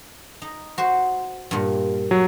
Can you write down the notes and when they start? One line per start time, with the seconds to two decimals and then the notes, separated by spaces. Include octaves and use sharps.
0.42 D#4
0.78 F#4 C5
1.51 G2 A#2
2.11 F#3